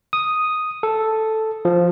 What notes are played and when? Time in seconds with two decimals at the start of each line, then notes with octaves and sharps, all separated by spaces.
0.13 D#6
0.83 A4
1.65 F3